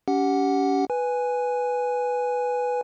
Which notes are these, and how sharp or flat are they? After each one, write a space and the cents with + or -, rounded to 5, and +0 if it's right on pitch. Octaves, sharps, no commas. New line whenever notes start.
C#4 +30 G4 -15 F#5 +0
B4 +0 G#5 +0